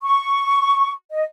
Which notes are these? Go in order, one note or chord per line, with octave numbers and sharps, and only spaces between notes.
C#6
D#5